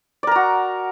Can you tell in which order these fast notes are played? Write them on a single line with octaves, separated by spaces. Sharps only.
D5 A#4 A#5 F#4